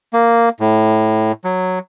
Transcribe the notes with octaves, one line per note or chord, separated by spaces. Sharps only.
A#3
A2
F#3